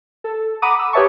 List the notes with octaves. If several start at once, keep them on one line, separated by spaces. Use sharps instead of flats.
A4
F#5 A#5 B5 D6 D#6 D#7
E6
G4 B4 C#5 E5 A5 C#6